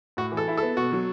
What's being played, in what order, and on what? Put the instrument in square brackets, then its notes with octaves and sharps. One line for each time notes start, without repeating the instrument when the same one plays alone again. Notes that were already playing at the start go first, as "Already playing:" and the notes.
[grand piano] A2 [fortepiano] F#4
[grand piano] E3
[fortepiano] A4
[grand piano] E4
[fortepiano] A4
[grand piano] B3
[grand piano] B2 [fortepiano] F#4
[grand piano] F#3